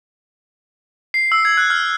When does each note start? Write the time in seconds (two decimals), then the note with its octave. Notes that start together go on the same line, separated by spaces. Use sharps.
1.14 C7
1.32 E6
1.45 G#6
1.57 F#6
1.70 F6